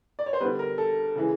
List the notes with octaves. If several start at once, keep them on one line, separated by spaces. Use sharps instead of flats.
D5
C#5
C5
D3 G3 B3 B4
A#4
A4
C#3 E3 G#3